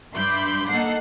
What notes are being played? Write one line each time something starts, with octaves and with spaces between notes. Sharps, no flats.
G2 E5 B5 C6 D6 G6
A#3 D#4 A4 F#5 C7